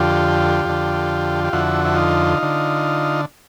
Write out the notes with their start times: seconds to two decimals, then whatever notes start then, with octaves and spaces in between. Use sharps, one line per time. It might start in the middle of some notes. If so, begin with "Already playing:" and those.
Already playing: F2 D3 F4 G4
0.65 F2 D3
1.44 G4
1.53 F2 D3 E4 F#4
1.85 E4
1.95 D#4 F4
2.43 D3